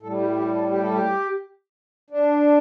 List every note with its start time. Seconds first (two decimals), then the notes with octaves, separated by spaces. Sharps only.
0.02 A2 A4
0.06 G3
0.20 G4
0.38 G4
0.55 A4
0.71 G4
0.82 A4
0.92 G4
2.10 D4